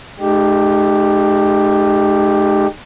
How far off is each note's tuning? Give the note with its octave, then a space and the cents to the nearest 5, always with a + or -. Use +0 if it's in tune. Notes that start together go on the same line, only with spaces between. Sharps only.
G#3 +45 D#4 -30 G4 +0